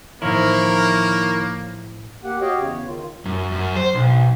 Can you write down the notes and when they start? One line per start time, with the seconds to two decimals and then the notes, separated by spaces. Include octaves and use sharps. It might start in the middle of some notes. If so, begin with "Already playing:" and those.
0.22 A2 D#3 F3 A#3 E4 A#4 C#5
2.24 A#3 G4 F#5
2.41 F#4 G4 C#5 D#5 F5 G5
2.58 E2 C#3 C#5
2.87 D#3 F4
3.26 F#2
3.52 F#2
3.76 C5
3.95 B1